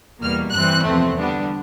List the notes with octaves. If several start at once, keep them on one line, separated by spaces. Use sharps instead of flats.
E2 B2 G3 A#3 F6
G2 E3 G3 C4 F#6
E2 C3 F3 A3 C4
D3 G3 B3 D4